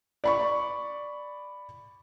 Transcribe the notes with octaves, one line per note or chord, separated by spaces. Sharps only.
D5 B5 C#6